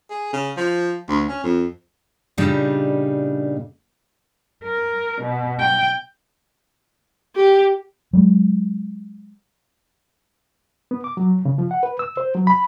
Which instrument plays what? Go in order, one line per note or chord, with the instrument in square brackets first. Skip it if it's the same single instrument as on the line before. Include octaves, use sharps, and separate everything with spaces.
[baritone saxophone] G#4
C#3
F3
D2
C#4
F2
[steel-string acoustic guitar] A#2 C#3 G3 D4 D#4
[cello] A#4
B2
G5
[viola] G4
[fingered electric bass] F#3 G#3
[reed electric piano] B3
D6
F#3
C#3
F3
F#5
B4
E6
C5
F#3
B5